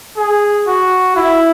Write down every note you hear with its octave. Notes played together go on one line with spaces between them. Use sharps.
G#4
F#4
E4